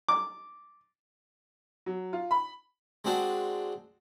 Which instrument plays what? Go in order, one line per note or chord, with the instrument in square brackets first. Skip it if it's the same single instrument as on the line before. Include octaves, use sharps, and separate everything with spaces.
[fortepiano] D6
[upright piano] F#3
F4
B5
[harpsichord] G#3 C4 D4 F#4